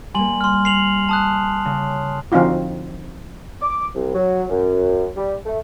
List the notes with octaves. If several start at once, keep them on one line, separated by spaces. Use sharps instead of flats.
G3 A#3 G#5 C6 F#7
C6 F6
C7 F7 F#7
A5 D#6 F#6
C#3
D3 F3 C4 D#4 F4 F#4
D6
C2
F#3
F#2
G3
A3